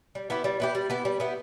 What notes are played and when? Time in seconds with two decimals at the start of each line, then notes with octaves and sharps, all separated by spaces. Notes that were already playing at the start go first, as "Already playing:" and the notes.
0.15 G3
0.30 B3 E4 G4
0.44 G3
0.60 B3 E4 G4
0.75 G3
0.90 B3 E4 G4
1.05 G3
1.20 B3 E4 G4